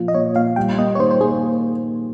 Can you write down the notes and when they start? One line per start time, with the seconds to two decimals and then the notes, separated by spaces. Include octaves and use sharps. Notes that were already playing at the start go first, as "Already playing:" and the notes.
Already playing: A#2 F3
0.08 D#5
0.14 A#2 C#5
0.36 A#2 F5
0.56 G3 G5
0.78 A#3 D#5
0.95 C#5
0.99 D#3 C5
1.11 C5
1.20 A#3 G#4